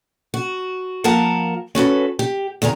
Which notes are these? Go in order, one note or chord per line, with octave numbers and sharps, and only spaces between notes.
F#4
F3 A#3 A#4 F5 F#5 A5
C#4 F#4 A4 B4
G4
E2 D3 G#4 A#5